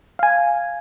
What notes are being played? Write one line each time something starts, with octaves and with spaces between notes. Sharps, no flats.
F5 G#5